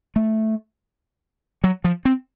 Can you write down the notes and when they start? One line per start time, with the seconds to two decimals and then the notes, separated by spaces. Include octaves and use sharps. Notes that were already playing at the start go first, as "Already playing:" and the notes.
0.16 A3
1.64 F#3
1.84 F3
2.05 C4